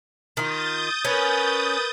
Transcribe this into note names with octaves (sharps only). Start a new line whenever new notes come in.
D#3 F4 D#6 G6 A6
C#4 A#4 B4